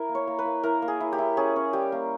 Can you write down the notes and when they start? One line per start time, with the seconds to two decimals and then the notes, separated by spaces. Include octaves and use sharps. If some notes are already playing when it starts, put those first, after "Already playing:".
Already playing: E4 A#4
0.09 A#3
0.15 C#5
0.27 A#3
0.39 B4
0.45 A#3
0.63 E4 A#4
0.82 A#3
0.88 G#4
1.00 E4
1.12 G4
1.18 E4
1.37 C#4 G#4
1.56 C#4
1.73 G3 G4
1.92 A#3